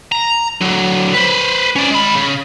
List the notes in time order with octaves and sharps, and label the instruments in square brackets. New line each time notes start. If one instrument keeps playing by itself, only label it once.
[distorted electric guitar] A#5
D3 F#3
B4 C5
C#4 D5
G#3 B5
C#3